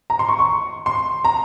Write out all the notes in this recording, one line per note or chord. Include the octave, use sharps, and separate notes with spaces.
A#5
C6
C#6
C#6
C6
A#5